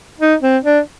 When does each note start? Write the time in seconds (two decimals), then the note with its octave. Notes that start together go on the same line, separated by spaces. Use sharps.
0.20 D#4
0.42 C4
0.64 D4